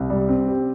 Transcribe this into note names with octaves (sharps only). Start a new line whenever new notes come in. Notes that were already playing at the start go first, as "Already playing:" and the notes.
Already playing: C2
G3
C4
G4